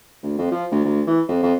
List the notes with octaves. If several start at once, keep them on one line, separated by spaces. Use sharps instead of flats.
D2
F2
F3
D2
D2
E3
F2
F2